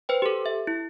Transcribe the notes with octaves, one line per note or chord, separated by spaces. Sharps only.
B4 C5 G5
G4 A4
E5
E4